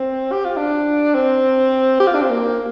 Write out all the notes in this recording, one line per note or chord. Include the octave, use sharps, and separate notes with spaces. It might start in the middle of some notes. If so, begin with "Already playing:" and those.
Already playing: C4
G4
F4
D4
C4
G4
F4
D4
C4
A#3